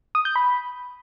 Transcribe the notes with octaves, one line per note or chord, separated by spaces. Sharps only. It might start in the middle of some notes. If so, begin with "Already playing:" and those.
D#6
G6
B5